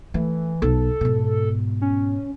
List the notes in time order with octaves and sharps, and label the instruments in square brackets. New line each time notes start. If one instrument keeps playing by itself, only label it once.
[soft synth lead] E3 [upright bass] A3
[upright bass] B1 [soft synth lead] A4
[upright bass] G#2 B2
[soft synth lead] C#4